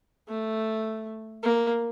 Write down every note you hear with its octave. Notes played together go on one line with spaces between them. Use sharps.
A3
A#3